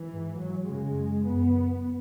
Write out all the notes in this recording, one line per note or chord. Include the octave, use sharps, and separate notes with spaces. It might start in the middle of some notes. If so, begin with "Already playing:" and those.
Already playing: E3
G#2
F#3
F#2 C#3 G#3
F#2 C#3 B3